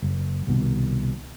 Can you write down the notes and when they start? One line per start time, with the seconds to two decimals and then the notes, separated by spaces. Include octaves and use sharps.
0.02 F#1
0.47 C2 B2 D#3